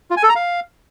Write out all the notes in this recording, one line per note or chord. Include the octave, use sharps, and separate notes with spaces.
F4
G#5
A4
A#5
F5